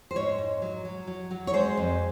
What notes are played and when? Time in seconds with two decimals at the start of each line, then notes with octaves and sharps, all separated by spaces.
0.11 C5
0.15 G#2 C#5
0.38 G#2
0.62 F#3
0.85 F#3
1.07 F#3
1.31 F#3
1.47 C#5
1.53 G#3 C5
1.77 F2